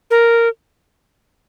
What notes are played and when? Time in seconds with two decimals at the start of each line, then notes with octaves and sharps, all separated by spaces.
0.11 A#4